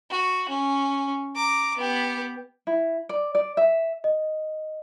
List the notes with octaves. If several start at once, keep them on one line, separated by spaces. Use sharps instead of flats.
F#4
C#4
A#5 D6
B3 G4
E4
D5
D5
E5
D#5